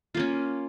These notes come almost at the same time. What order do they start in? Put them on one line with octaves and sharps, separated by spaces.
F4 A#3 C#4